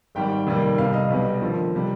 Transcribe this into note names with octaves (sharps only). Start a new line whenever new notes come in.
G#1 G#2 G3 G5
F1 D#2 D#3 G3
C2 C3 G3 F5
D#5
B1 B2 G3
D#2 D3 F3
C3 G3